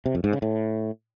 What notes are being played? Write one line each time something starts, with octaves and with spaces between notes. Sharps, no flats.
C3
F2
G#2
C#3
A2